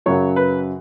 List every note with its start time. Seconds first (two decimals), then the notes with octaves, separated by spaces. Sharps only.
0.06 F#2 C#3 F#3 C#5
0.36 B4